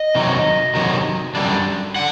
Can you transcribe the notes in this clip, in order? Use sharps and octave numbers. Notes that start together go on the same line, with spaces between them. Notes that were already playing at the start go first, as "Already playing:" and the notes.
Already playing: D#5
C3 D#3 F#3
C3 D#3 F#3
F#2 D3 G3 D4
D3 F#5